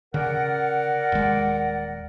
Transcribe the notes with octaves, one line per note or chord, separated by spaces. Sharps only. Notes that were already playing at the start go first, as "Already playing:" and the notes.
C#3 A#4 D5 F#5
D#1 G#3